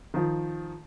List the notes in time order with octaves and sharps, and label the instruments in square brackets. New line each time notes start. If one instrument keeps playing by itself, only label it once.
[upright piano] D#3 F3